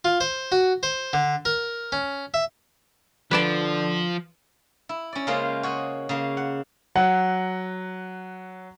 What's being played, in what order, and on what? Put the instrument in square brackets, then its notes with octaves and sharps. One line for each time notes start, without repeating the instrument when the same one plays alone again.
[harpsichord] F4
C5
F#4
C5
D3
A#4
C#4
E5
[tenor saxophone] D3 [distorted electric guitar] F3 [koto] B4 D5 A5
[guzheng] E4
C#4 D5
C#3 G#3 A#3 F4 C5
F#4 C#5 D#5
C#3 A#3
F#5
[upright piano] F#3 F#5